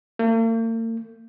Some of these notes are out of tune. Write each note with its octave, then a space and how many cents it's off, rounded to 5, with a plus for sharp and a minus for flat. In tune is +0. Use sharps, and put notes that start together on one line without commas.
A#3 -45